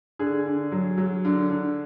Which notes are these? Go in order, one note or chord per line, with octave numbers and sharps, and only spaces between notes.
D3 G#4
D3
F#3
F#3
D3
D3